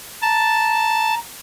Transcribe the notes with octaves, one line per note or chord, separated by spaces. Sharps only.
A5 A#5